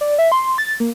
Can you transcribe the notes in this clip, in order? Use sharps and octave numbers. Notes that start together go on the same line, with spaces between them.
D5
E5
C6
A6
A#3